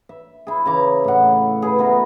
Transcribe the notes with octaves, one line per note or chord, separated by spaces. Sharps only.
E5
E4 G#4
C#3 E3 A#5 D6
A2 F#5
G#4 B4
A3 B3 F#4 A#4